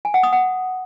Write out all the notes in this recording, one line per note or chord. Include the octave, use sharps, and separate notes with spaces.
G#5
F#5
D#6
F#5